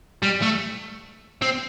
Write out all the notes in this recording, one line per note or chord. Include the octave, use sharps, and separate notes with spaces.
G3
A3
C4